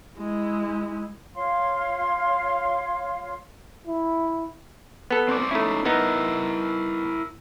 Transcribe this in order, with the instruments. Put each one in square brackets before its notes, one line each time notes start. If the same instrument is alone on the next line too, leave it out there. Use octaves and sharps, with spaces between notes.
[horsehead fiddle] G#3 E4
[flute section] F4 C#5 F5 C6
[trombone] E4
[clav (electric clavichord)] B3 A4
[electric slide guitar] C4 C5 D5
[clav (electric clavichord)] A3 E4 [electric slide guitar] C#4 D#4
[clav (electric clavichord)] B3 D#4 [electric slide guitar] E4 A#4